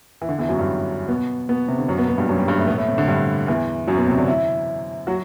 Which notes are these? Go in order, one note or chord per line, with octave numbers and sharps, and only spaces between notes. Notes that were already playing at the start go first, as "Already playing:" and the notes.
E3
D3
E2 E3
F#2 F#3
G2 G3
B2 B3
B2 B3
C3
D3
F#2 F#3
B2 B3
B2 B3
G2 G3
F#2 F#3
G2 G3
G2 G3
A2 A3
B2 B3
A2 A3
C3
D3
G2 G3
E2 E3
F#2 F#3
B2 B3
C3 C4
D3 D4
E3 E4
F#3 F#4